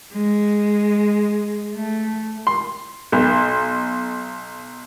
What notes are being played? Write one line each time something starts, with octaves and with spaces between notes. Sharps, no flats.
G#3
A3
C6
B1